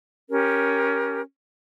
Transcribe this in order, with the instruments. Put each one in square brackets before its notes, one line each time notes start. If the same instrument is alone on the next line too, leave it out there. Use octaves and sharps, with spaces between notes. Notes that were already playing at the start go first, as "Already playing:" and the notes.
[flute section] C#4 G4 A#4